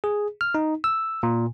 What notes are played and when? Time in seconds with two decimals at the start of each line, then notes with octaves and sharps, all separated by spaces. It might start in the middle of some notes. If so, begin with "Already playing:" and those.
0.04 G#4
0.41 F6
0.55 D#4
0.84 E6
1.23 A#2